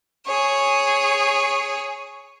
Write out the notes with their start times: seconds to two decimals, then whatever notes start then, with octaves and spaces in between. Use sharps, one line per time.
0.25 G#4 C#5